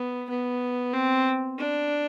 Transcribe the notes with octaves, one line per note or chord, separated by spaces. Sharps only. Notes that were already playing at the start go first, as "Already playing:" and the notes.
Already playing: B3
B3
C4
D4